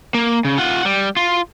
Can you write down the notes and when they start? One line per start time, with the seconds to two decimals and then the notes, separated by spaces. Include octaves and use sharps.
0.14 A#3
0.45 C#3
0.58 F4 F#5
0.85 G3
1.16 F4